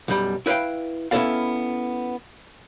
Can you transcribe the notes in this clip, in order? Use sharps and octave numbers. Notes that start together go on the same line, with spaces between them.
B1 F#2 G3
E4 B4 C#5 F5 G5
B3 C#4 E4 A4 D5 F5